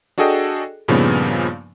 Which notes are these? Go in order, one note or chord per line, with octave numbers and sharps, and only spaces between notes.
D4 F#4 G#4 A4 D#5 G5
G2 A#2 C#3 F3 B3 D#4